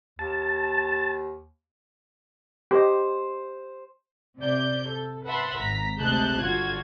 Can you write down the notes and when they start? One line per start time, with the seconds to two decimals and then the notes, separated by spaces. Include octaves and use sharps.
0.19 D#2 A5
2.71 G4 C5 D#5
4.39 C3 D5 G6
4.90 A4
5.25 B4 E5 F#5 A5 B5 C6
5.58 G#1 A#5 B6
5.98 D2 C3 G#3 A5 F#6 G6
6.40 G1 D3 F4 F#4 G#6